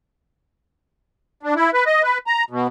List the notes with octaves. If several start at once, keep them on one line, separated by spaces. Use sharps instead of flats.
D4
E4
B4
D#5
B4
A#5
B2